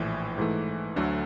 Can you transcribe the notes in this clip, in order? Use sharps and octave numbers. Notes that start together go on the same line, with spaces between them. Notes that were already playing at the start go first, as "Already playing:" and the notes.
Already playing: A#1 A2 E3
G#2 E3 A3
D2 D3 F#3 A3